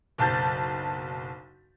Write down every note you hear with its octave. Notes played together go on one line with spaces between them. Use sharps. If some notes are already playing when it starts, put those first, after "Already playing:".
F#1 B1 A5 G6 A6